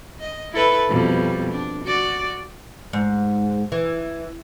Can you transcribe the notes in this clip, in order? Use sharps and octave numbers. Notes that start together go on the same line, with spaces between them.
D#5
E4 A4 B4
F2 B2 G3
D4
F#4 D5
G#2
E3